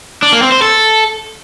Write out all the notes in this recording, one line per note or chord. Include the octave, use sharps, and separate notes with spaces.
D4
A#3
C4
C5
A4